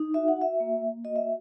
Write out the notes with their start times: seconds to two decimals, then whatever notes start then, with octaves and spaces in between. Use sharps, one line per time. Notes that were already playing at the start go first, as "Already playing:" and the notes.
Already playing: D#4
0.14 F#4 E5
0.28 F#5
0.37 F#4 E5
0.60 A#3
0.82 A#3
1.05 F#4 D#5
1.16 E5